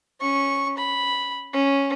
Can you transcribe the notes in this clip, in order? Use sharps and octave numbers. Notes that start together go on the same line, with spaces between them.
C#4 C#6
B5
C#4